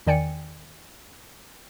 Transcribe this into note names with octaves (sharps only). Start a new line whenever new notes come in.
E2 D#3 D5 G5 G#5 C#7